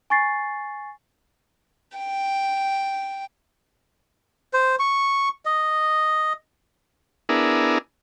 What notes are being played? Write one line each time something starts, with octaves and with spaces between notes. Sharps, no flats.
G#5 C#6 A6 C7
G5
C5
C#6
D#5
B3 D4 E4 G#4 A#4